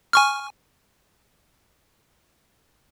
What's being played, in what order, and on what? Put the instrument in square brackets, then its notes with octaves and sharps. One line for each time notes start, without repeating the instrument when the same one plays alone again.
[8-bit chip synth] G#5 C#6 F6